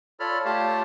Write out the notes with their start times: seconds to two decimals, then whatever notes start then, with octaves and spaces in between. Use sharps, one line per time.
0.20 F4 A4 C#5 D5 B5 F6
0.45 A3 F4 G4 C#5 F5 A5